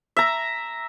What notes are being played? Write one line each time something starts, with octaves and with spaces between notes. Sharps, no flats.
E5 A#5